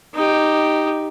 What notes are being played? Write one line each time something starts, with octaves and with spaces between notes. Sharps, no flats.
D#4 G4